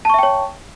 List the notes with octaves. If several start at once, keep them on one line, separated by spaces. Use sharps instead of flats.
C#5 E5 G5 A5 C#6